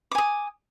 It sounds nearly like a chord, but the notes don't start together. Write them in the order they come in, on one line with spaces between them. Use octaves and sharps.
D6 G#5 D#6